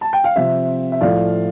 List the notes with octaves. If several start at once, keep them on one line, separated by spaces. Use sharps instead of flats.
A5
G5
F5
C3 F3 C4 E5
E5
A2 F3 A3 D5 F5